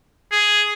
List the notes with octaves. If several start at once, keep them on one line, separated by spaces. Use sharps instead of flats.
G#4